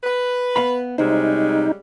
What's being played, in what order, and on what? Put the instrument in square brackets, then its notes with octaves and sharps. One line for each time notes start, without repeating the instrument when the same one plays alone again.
[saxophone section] B4
[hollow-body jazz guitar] B3 F5 B5
[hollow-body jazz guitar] C2 C5 [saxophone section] C#3 G3 G#3 [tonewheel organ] D#4